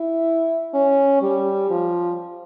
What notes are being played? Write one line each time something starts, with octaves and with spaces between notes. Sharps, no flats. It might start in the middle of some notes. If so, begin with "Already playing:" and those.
Already playing: E4
C#4
G3
F3